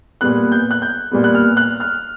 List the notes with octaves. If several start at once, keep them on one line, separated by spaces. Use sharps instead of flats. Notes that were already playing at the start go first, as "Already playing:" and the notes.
A#2 G3 B3 F#6
G6
F#6
G6
A#2 G3 B3
F#6
F6
F#6
F6